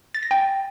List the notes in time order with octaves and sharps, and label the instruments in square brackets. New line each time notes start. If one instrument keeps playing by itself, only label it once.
[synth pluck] A6
A#6
G5